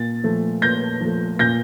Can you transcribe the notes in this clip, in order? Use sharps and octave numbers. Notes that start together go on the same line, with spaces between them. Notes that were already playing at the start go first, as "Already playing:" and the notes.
Already playing: A#2 A6
F3 A3
A#2 G6 A#6
F3 A3
A#2 G6 A#6